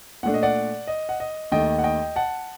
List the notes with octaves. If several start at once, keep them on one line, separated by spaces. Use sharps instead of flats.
A#2 A3 D4 F#5
D#5
D5 F#5
D#5
F#5
D#5
D#2 D#3 A3 D#5 G5
F#5
D#5 G5
F#5 A5